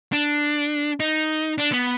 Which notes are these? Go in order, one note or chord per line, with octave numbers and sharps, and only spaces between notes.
D4
D#4
D4
B3